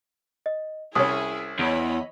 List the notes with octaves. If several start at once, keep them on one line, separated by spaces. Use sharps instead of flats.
D#5
C2 C#4 E4 G#4 E5 D#6
E2 C#5 D#5 B5 D7